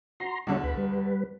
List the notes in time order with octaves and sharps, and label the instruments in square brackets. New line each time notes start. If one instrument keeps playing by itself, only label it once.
[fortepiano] F#4 [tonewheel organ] A#5 C6
[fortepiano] E2 B2 D3 [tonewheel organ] G3 C#5 E5
[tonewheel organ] D2 B4 B5
G3 B4